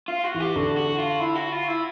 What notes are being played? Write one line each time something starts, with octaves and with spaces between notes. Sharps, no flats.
F4
F#4
E3
G4
D3 F#4
F#4
F4
E4
F#4
F4
E4